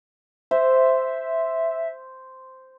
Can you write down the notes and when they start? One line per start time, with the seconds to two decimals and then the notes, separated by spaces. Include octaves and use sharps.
0.51 C5 E5